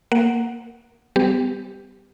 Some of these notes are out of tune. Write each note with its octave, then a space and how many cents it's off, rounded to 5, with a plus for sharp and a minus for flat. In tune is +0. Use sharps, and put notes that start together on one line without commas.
A#3 +0 F#5 +0
G3 +0 B3 +30 G4 +0